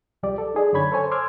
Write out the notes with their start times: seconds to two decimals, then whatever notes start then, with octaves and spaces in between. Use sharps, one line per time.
0.23 C2 F3 G3 G4 D5 D6
0.38 A4
0.54 D#4 G#4 D5
0.73 F#2 D3 C#5 B5 G#6
0.92 A4 C5 C#5 G#5
1.11 C6 D6 E6 F6 G#6